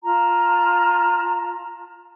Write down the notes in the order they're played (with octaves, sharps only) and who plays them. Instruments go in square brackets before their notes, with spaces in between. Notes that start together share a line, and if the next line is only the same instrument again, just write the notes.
[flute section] F4 A5 A#5